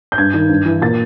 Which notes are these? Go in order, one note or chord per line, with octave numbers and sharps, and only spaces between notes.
G6
G2 G#6
D#3
G2
E3
A#2 A6